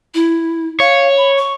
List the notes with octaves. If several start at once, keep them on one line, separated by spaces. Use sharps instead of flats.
E4
C#5 F5
B5
C#6